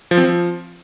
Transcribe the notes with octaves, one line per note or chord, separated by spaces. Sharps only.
F3
C4
F3